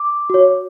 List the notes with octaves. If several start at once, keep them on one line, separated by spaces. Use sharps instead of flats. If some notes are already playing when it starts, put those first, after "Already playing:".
Already playing: D6
F#4 C#5